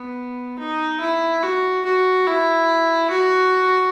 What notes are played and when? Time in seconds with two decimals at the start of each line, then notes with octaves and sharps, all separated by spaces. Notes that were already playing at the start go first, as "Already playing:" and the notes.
Already playing: B3
0.59 D#4
1.00 E4
1.43 F#4
1.85 F#4
2.27 E4
3.10 F#4